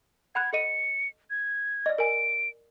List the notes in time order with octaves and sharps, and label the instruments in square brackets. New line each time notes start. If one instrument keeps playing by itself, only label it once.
[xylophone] F#5 B5 F#6 [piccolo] G#6
[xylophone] A4 D#5 D#7 [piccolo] C#7
[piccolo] G#6
[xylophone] D5 D#5
[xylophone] A#4 G#5 [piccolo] D7